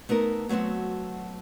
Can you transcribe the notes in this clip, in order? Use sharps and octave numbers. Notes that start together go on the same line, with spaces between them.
A3 B3 D#4 A#4
F#3 A3 B3 C4 F#4